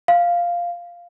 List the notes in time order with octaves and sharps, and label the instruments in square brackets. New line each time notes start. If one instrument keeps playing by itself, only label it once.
[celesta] F5